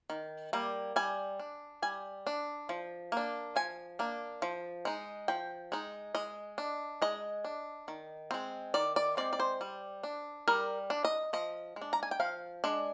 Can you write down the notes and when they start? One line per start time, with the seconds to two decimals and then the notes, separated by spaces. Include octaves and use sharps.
0.10 D#3
0.53 G3 A#3
0.96 G3 G#5
1.40 D4
1.82 G3 G#5
2.27 D4
2.69 F3
3.12 A#3 D4
3.56 F3 G#5
3.99 A#3 D4
4.42 F3
4.85 G#3 D#4
5.28 F3 G5
5.72 G#3 D#4
6.15 G#3 D#5
6.58 D4
7.02 G#3 D#5
7.45 D4
7.88 D#3
8.31 G#3 C4
8.74 D#3 D5
8.96 D5
9.17 G#3 C4 D5
9.33 D5
9.40 C5
9.61 G3
10.03 D4
10.48 G3 A#4
10.90 D4
11.05 D#5
11.33 F3 D#5
11.76 G#3
11.82 D4
11.93 A#5
12.03 G#5
12.11 G5
12.20 F3 F5
12.64 G#3 D4